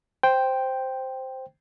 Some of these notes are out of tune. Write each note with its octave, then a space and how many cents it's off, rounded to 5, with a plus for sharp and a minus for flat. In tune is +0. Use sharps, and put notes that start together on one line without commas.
C5 +0 G5 +0